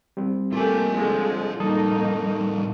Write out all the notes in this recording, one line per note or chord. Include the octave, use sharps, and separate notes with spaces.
G3 C4
A3 A#3 F4 G4 G#5
D3 F3 G#3
A2 G3 A#3 D#4 A4 A5 D#6